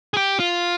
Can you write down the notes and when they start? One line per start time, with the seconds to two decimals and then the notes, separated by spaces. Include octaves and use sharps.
0.14 G#4
0.17 G4
0.40 F4